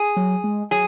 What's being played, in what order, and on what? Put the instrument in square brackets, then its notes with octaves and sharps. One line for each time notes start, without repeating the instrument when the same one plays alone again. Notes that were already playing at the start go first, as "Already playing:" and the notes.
Already playing: [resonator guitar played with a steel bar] G#4
[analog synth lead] F#3
G#3
[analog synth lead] F#3 [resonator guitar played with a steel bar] G#4